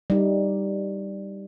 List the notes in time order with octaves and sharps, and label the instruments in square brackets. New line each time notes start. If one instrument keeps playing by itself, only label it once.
[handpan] G3 D#4